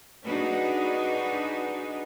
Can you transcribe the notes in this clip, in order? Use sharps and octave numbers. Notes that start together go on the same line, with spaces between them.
D4 D#4 F#4 G#4 B4